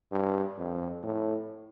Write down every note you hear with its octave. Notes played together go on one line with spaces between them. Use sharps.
G2
F2
A2